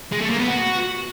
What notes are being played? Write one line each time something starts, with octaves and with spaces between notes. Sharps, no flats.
G#3
A3
A#3
B3
F#4